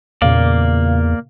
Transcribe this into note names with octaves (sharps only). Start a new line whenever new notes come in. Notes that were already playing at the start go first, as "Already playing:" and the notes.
E2 A#2 C#3 A#3 D5 F5